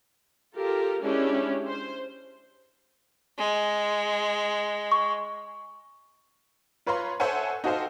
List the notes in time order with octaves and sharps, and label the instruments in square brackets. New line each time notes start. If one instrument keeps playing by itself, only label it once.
[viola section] F4 G4 A4 A#4
G#3 C#4 D4 E4 G4
C5
[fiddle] G#3
[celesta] C#6
[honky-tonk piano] F4 B4 C#5 F5 A#5 C6
A4 C5 C#5 E5 F#5 G#5
D#4 F#4 G4 A4 C5 F5